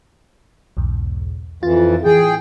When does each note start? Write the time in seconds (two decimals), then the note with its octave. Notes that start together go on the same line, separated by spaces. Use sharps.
0.77 B1 E2 G#2
1.63 F2 E3 F4 A6
2.05 A2 E3 G#4 G5